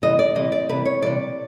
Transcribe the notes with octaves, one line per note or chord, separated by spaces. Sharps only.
C3 E3 G3 D#5
D5
C3 E3 G3 D#5
D5
C3 E3 G3 B4
C#5
C3 E3 G3 D5